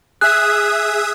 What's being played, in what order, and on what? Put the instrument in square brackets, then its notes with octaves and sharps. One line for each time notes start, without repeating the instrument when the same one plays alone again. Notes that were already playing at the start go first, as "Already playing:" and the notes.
[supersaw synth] G#4 E5 D#6 [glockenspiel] F#6